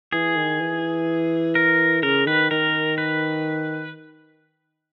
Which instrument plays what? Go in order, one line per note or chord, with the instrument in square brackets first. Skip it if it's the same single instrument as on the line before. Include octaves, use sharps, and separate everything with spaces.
[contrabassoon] E3 [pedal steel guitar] G#4
[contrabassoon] D#3
E3
[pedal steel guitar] A#4
[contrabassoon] C#3 [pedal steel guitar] A#4
[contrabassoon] D#3 [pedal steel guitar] B4
[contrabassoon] D#3 [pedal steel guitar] A#4
[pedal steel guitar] B4